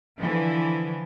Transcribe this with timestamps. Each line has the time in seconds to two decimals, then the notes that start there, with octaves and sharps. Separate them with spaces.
0.19 D3 E3 F3